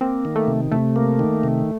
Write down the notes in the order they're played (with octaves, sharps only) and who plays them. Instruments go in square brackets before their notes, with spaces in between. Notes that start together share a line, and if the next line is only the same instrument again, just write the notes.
[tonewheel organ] A#3 [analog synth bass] C4
[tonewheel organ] D#3
[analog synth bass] A3
[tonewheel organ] C3
[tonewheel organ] C3 [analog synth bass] A3
[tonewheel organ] A#3
D#3
C3